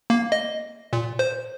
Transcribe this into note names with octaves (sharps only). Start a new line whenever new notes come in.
A#3
D#5
A#2
C5